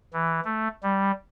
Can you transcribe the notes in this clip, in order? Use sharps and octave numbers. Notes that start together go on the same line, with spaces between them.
E3
A3
G3